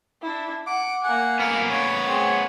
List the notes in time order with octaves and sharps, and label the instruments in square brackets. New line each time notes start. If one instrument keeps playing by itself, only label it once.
[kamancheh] D4 E4
[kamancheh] F#5 [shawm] D6
[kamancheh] A#3 G#5 [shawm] F#5
[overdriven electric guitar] B3 A#4 [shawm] F5
[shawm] C#5
[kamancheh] C4 G#4